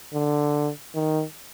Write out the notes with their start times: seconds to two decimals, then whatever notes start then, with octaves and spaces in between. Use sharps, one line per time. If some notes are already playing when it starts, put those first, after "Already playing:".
0.14 D3
0.95 D#3